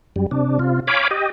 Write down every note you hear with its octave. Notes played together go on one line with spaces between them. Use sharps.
F#2 G3
C3 D4
C3 F4
C#5 F5 G#5 B5 D6
G4 D#5